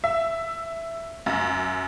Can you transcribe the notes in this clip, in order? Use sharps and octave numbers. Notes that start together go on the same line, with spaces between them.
E5
F#2